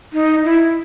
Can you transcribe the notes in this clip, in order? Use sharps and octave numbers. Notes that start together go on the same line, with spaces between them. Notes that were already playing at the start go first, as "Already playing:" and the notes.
D#4
E4